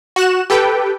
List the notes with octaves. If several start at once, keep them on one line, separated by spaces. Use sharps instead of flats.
F#4 F#6 E7
G4 A4 B4 G5